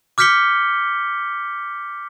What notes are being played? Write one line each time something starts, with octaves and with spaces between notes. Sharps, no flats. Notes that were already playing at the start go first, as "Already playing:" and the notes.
D6 F6 G6 B6 C#7 G7